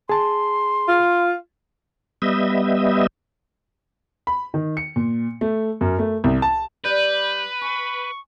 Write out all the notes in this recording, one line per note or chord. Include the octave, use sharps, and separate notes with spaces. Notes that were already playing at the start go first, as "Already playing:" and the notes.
G#4 A5 C6
F4
G3 B3 D#5 E5
B5
D#3
C#7
A#2
A3
F#2
A3
C2
A5
G3 B4 D5 G6
G#5 C#6